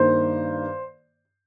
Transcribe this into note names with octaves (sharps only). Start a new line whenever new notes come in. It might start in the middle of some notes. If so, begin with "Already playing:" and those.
Already playing: G2 D#3 A#3 C5